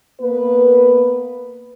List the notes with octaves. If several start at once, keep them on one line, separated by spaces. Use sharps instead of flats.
A#3 B3 B4